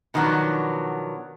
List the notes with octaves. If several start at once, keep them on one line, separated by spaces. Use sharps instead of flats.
B2 D#3 F3 F#3 B3 D4